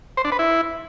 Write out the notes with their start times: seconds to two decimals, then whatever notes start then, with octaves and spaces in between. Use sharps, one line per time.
0.17 C5
0.25 D4
0.32 B4
0.39 E4